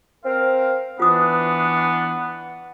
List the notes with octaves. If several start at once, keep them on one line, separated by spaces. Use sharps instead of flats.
C4 A#4 F5
E3 B3 D4 F4 D#6